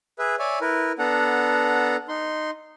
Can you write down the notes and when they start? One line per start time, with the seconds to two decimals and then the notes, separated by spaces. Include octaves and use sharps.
0.19 G#4 B4 E5
0.39 C#5 D5 E5 G#5
0.61 E4 A#4 B4
0.99 B3 D4 A4 F#5 A#5
2.09 D#4 C6